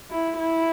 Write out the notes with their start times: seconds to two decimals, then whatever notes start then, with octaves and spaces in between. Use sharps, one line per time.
0.11 E4
0.38 E4